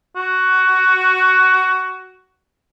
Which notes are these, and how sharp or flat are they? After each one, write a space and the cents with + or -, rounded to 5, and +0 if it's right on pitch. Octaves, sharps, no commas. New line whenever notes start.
F#4 +10